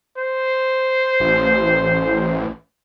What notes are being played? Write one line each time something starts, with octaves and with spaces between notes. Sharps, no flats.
C5
A1